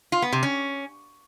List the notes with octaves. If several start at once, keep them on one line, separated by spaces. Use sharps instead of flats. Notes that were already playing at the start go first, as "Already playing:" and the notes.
F4
B3
C3
C#4